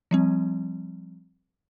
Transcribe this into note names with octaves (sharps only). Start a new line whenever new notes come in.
F3 G3 C4